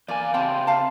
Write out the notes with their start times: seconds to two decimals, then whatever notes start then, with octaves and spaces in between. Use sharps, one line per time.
0.08 E2 A#3 D5 F5 G#5 A#5
0.34 C#3 C4 C5 D5 G5 A5 B5
0.67 F5 A5